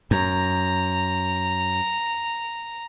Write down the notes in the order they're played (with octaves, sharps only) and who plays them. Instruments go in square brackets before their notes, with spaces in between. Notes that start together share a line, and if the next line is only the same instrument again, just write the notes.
[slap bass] F#2 [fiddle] A#5